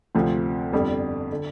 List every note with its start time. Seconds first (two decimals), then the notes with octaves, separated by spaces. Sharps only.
0.15 D2 C3 F3 C4
0.73 G1 F2 D3 G3
1.32 D3